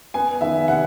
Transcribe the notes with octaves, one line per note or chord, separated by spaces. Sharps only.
B3 G#5
D#3 E5
C3 F#5